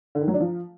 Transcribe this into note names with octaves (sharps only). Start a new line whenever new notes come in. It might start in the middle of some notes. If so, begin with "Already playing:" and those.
D3
D#3
F#3
D4
F3